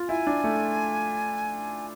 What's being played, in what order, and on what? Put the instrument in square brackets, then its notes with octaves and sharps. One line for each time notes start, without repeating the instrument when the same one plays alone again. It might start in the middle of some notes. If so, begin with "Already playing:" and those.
Already playing: [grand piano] F4
[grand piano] E4 [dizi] G#5
[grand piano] D4
A3